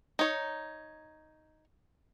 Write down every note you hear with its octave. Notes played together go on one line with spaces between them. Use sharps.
D#4 C#5